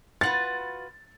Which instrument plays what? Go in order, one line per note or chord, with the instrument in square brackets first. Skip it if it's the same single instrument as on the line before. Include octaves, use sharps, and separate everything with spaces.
[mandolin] F4 F#4 B4 [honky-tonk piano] A6